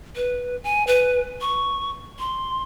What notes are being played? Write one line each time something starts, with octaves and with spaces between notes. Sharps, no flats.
B4
G#5
B4
C#6
C6